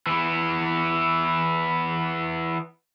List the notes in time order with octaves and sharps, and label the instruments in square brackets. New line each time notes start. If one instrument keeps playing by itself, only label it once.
[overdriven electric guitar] E3 B3